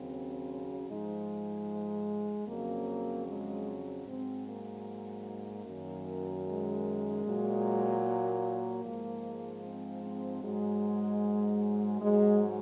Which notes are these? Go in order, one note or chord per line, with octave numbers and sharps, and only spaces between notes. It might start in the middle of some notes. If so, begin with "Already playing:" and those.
Already playing: D#2 C#3 F#3 C4
G#2 F3 G#3 D#4
F2 C#3 F#3 A#3
G#3
G#2 F#3 C4
A#3
F#2 D#3 F#3
G#3
A#2 F#3
A#3
G#2 F3 G#3
C4
C4
G#2 F#3 G#3
G#2 F#3 G#3